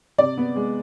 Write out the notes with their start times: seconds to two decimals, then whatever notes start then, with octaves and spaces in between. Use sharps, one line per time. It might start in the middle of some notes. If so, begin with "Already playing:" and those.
0.18 C3 D5
0.38 B3
0.56 G#3